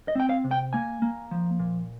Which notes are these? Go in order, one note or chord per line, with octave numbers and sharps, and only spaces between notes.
D#5
C4 G5
F5
C3
G5
A#3 G#5
A#3
F3
A#2